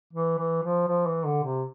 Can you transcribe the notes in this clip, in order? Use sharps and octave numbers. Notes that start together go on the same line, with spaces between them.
E3
E3
F3
F3
E3
D3
C3